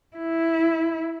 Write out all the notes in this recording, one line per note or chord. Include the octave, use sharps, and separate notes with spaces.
E4